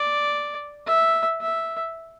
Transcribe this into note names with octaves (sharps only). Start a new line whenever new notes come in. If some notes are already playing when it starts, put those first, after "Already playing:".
Already playing: D5
E5
E5